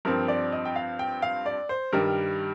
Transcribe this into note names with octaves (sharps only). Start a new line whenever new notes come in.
G2 F3 C4 A#4
D5
D#5
G5
F5
G5
F5
D5
C5
G2 D#3 G3 A#4